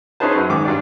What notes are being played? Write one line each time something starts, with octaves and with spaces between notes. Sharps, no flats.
C#4 D#4 G#4 B4 C5 A5
F#2
G#2 D#3 D6
G2 D5